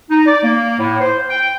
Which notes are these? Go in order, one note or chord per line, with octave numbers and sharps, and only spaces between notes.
D#4
D5
A#3
A2
C5
G5